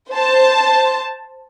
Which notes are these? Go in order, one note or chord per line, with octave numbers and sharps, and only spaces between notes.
C5 A5